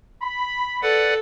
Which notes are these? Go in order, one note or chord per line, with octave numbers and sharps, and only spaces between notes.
B5
A4 B4 D5 F#5